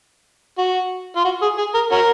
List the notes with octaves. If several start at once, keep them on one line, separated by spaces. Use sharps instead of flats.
F#4
F4
F#4
G#4
G#4
A#4
C#4 F#4 A#4